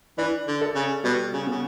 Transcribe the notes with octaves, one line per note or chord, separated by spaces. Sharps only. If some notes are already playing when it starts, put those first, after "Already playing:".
E3 D4
D3
A4
C#3
B2 G3
C#3
C#3 B3